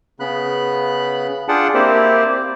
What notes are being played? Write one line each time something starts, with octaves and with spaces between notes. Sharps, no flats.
C#3 B3 B5 F#6
D4 F4 G#4 F#5 G5 A5
A#3 C4 E4 G4 C5 D5